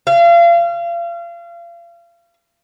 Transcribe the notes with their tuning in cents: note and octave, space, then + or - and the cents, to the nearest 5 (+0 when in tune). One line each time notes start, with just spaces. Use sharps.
F5 -35